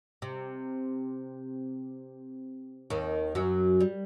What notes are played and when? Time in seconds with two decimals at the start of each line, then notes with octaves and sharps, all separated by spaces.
0.22 C3
2.90 D#2 D#3
3.35 F#2 F#3
3.80 G3